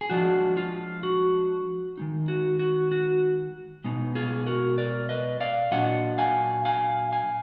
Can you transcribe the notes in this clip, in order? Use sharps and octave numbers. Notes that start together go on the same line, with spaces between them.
G#4
F3 G#3 D4 F4 F#4
F4
F#4
D#3 G#3 D#4
F#4
F#4
F#4
B2 G#3 B3 D#4
F4 G#4
F#4 A#4
A#4 D5
B4 D#5
D5 F5
A#2 F#3 D4 F4 D#5 F#5
F5 G#5
F5 G#5
F5 G#5